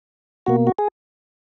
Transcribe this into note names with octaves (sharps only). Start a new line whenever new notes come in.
B2 A#3 F#4
F#4
G#4